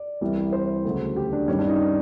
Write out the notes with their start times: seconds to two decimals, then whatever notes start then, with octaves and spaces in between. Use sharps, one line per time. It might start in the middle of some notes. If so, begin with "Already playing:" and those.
Already playing: D5
0.21 C2 C3 E3 G3
0.52 C5
0.84 D2 C#3 F#3
1.16 G4
1.33 D4
1.48 G2 D#3 G3 C#4
1.59 D4
1.69 D#4